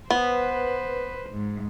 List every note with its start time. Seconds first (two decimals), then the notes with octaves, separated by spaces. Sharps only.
0.10 B3 B4 C5
1.30 G#2